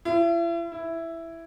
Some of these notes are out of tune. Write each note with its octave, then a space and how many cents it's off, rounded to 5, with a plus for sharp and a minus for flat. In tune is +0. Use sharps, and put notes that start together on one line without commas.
E4 +40
E4 +5